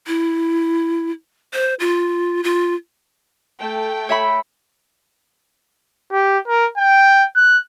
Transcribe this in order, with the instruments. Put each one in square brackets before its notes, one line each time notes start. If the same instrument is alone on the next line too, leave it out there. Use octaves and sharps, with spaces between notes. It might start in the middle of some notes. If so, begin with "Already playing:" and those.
[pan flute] E4
C5
F4
F4
[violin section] A3 G5
[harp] C#5 E5 B5
[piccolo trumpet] G4
A#4
G5
F#6